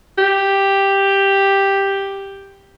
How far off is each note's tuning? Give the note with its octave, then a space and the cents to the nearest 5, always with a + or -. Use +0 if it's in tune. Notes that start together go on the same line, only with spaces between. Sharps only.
G4 +5